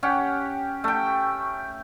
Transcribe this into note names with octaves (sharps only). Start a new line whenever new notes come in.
C#4 G4 F#5
A3 G5